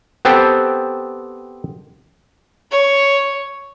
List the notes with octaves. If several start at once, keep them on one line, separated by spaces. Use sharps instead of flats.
B3 C4 G4 A4 C5
C#5